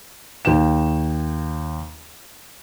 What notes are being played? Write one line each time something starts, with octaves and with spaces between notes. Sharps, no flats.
D#2 G5 E7